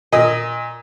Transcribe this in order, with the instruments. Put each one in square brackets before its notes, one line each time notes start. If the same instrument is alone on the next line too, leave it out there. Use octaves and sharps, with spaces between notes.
[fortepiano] A#2 [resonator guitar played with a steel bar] D#5